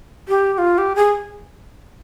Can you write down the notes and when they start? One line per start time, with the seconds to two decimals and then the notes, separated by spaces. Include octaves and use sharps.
0.29 G4
0.53 G4
0.58 F4
0.78 G4
0.96 G#4